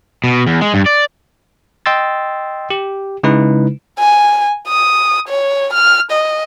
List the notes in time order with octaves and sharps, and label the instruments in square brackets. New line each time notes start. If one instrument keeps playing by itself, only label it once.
[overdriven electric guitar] B2
E2
G#3
G2
D5
[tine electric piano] D#5 G5 C6 E6 A6
G4
C#3 G#3 D#4 E4 B4
[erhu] G#5
D#6
C#5
F6
D#5